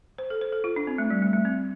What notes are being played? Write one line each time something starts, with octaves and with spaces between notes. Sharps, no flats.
C5
A4
C5
A4
F4
D4
C4
A3
G3
A3
A3
C4